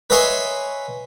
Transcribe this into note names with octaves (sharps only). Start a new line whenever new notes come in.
B4 C#5 D#5 E5 G#5 C6